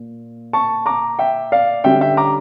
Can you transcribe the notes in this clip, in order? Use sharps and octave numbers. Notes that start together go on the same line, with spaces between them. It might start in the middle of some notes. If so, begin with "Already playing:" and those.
Already playing: A#2
A5 C#6
A#5 D6
E5 G5
D5 F5
D3 G3 C#4 E5 G5
E5 G5
A#5 D6